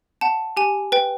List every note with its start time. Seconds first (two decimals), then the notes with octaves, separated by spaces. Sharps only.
0.21 F#5 A5
0.57 G4 G#5
0.92 B4 G5